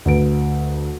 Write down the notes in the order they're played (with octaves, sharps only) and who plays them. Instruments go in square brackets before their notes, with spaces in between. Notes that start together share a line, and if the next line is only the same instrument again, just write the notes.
[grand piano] D2 B4 D7